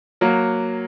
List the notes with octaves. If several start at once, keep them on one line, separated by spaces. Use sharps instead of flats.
F#3 A#3